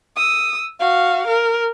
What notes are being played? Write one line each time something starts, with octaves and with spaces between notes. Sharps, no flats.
D#6 E6
F#4 F5
A#4